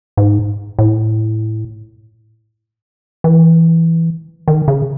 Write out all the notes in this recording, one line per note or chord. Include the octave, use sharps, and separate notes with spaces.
G#2
A2
E3
D#3
C#3